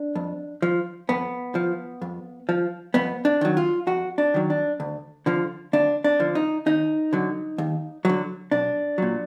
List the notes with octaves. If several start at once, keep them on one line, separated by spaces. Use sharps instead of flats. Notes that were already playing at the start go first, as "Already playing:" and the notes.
Already playing: D4
F2
F3
F2 B3
F3
F2
F3
F2 B3
D4
D#3 F#3
F4
F2 F#4
D4
D#3 F#3
D4
D2
D3 F3
D2 D4
D4
D3 F3
D#4
D#2 D#4
D3 F#3
D#2
D3 F#3
B1 D4
A#2 F#3